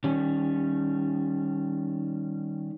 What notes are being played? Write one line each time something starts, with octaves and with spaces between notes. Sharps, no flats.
D#3 G3 C#4